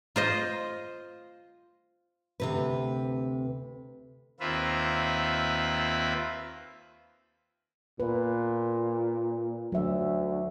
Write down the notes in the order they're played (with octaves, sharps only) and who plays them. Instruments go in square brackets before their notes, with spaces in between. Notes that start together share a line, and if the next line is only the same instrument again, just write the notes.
[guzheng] F4 C5 D#5
[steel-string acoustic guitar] D2 C3 B4
[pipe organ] D#2 A#3 C4 F4 B4 E5
[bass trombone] A#2 [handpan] B4
[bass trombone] D2 [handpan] F#3 E5